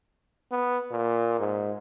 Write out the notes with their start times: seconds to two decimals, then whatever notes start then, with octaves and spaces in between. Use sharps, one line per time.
0.52 B3
0.91 A#2
1.39 G#2